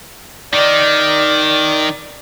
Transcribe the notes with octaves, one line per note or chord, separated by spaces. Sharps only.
D#3 D5